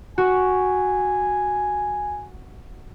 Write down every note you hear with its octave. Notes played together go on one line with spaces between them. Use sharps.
F#4 G#5